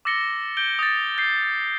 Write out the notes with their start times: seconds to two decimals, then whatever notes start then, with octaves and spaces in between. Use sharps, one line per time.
0.05 D6 E6 A6 A#6 C#7 G7
0.57 G6 D7 G7
0.79 D#6 A6
1.17 D#6 G6 C7